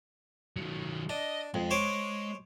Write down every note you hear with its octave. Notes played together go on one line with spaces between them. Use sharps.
D#3 F#3
D4 D#5
F2 G#3
C5 C#5 D6